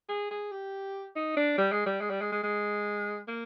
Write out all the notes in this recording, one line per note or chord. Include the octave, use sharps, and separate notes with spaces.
G#4
G#4
G4
D#4
D4
G3
G#3
G3
G#3
G3
G#3
G#3
G#3
A#3